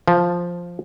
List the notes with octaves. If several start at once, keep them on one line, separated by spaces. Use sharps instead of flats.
F3